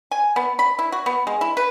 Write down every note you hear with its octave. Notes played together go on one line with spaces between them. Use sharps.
G#5
B3
B5
E4
F#4
B3
G#3
E4
B4